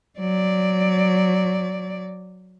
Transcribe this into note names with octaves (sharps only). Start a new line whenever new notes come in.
F#3 D5